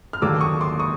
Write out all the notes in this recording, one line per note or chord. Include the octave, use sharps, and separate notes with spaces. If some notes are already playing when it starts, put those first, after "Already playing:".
F6
D#2 D3 F#3 A#3 D6 E6
C#6 D#6
C6 D6
C#6 D#6